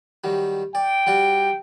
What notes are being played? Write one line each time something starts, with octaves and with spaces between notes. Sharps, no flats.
D#3 F#3 G3
D5 G5
G3 F#4 D5